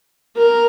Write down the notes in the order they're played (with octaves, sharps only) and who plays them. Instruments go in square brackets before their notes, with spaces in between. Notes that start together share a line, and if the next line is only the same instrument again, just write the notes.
[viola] A#4